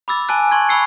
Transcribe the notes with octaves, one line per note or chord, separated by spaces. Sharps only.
B5 D6 E6 A6
G#5 A5 F#6
C6 C#6 F#6 G#6
B5 C#6 E6 C7 C#7